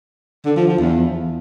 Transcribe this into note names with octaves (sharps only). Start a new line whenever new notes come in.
D3
F3
F3
E2